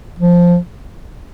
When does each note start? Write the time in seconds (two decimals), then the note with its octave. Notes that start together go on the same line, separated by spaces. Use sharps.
0.19 F3